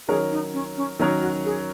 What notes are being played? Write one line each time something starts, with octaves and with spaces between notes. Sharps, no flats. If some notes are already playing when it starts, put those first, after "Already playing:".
D#3 F#3 C#4 G#4 A#4 C#5
D#4
C#4
C#4
D#3 F#3 C#4 D#4 A#4 C#5
F#4
G#4